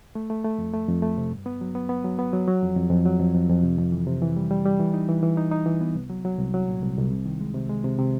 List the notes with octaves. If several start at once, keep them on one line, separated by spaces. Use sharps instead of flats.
A3
A3
A3
F2
A3
F2
A3
C3
G2
B3
F#3
B3
B3
F#3
B3
F#3
F#3
F2
F2
F2
F#3
F2
F2
F2
C3
F2
E3
C3
E3
G3
G3
G3
E3
D#4
E3
E3
D#4
D#4
E3
B3
C2
F#3
F#3
C2
F#3
A#2
C2
C2
C3
D#3
G#3
C3
G#3
C3
C3